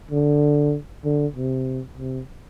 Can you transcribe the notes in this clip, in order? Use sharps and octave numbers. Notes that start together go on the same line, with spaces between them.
D3
D3
C3
C3